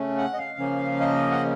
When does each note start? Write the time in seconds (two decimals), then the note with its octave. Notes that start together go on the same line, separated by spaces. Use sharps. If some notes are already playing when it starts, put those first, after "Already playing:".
Already playing: C#3 A3 C#4
0.18 F#5
0.33 D#5
0.38 F5
0.58 C#3 F3 A#3 C#4
1.00 D#5
1.32 F#5